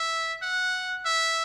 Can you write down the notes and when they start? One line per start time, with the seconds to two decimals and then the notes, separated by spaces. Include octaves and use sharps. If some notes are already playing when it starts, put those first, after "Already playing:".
Already playing: E5
0.42 F#5
1.06 E5